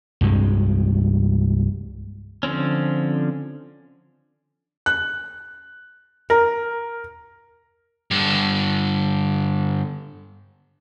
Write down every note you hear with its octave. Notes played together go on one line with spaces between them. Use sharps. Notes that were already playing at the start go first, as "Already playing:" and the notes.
C2 G2 C3 G#3
D3 F3 C4 C#4
F#6
A#4
G2 D3